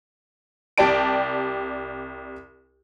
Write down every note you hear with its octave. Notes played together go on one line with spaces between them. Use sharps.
C2 G4 D5 A5 D7